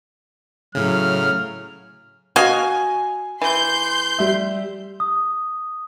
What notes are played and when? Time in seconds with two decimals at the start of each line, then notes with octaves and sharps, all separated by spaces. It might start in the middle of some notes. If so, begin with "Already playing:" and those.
0.75 A2 C#3 F#3 F6
2.36 F#4 D#5 F5 G#5
3.42 E3 C6 G6
4.19 G3 E5
5.00 D#6